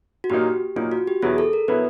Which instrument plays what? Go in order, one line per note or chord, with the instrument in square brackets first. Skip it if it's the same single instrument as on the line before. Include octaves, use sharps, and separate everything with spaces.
[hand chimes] F#4
[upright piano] A#2 F#3 A#3 D#4 [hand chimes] G4
[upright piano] A#2 F#3 A#3 D#4 [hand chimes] F4
[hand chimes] F#4
G4
[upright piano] E2 B2 F#3 B3 E4 [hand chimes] G#4
[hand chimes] A4
A#4
[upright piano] B2 F#3 B3 E4 [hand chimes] B4